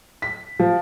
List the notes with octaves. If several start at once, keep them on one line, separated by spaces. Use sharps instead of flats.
B6
F3